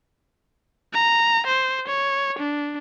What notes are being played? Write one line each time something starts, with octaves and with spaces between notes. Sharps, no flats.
A#5
C5
C#5
D4